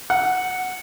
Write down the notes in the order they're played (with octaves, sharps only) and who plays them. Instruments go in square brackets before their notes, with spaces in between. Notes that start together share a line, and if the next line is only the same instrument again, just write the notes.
[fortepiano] F#5